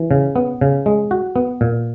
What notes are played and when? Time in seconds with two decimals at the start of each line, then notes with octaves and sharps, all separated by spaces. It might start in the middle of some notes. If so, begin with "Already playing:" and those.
Already playing: E3
0.11 C#3
0.36 B3
0.61 C#3
0.86 G#3
1.11 F#4
1.36 B3
1.61 A#2